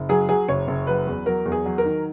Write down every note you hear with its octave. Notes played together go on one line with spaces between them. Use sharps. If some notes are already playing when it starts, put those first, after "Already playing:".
Already playing: F#1
F#3 G#4
F#3 G#4
F#1 C#5
F#1
F#3 B4
E2
F#3 A#4
E2
G#4
F#3
A#4
D#3